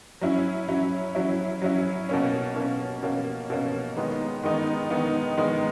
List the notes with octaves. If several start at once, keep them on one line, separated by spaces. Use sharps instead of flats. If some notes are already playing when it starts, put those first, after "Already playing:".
F#3 C#4 E4
F#3 C#4 E4
F#3 C#4 E4
F#3 C#4 E4
B2 A#3 C#4
B2 A#3 C#4
B2 A#3 C#4
B2 A#3 C#4
D#3 G#3 B3 D#4
D#3 G#3 B3 D#4
D#3 G#3 B3 D#4
D#3 G#3 B3 D#4